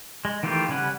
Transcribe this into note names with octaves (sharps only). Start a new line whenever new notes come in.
G#3
D#3 E3 A3 F4 G4
C#3 G3 C#4 B4 F#5